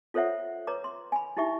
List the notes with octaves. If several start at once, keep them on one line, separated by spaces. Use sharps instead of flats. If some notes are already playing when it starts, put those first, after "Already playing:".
F4 A4 C5 C#5 E5 F#5
B4 C#5 A#5 D6
C6
G#5 B5
D#4 E4 G4 E5 C#6